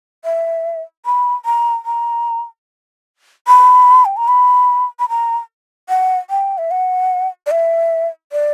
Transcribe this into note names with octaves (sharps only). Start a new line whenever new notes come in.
E5
B5
A#5
A#5
B5
G5
A#5
B5
B5
A#5
F#5
G5
E5
F#5
D5
E5
D5